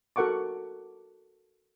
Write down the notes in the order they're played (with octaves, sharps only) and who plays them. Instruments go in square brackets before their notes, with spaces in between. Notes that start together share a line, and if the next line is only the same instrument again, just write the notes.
[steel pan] F#4 A4 A#4 F#5 C#6 D6